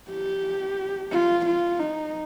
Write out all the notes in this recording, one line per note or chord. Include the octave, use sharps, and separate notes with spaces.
G4
F4
F4
D#4